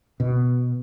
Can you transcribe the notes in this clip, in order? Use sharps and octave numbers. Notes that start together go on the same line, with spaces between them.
B2